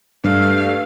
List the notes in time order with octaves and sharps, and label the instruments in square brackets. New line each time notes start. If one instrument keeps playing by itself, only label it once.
[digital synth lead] G2 [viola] A3 F5